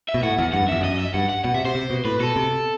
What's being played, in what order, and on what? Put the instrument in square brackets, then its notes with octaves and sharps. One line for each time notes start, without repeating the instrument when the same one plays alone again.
[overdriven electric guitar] E5
[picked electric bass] B2
[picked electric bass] A2 [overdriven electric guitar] F#5
[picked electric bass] E2
[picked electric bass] G2 [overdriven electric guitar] F#5
[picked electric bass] F#2
[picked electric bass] E2 [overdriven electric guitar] E5
[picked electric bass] F#2 [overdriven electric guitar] D#5
[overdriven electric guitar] E5
[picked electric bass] G2 [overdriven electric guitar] F#5
[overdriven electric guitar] F#5
[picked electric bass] B2 [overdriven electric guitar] F#5
[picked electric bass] C3 [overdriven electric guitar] E5
[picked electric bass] C3 [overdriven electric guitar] C5
[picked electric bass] C3
B2
[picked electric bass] A2 [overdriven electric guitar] B4
[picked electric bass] B2 [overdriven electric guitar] A4
[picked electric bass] C3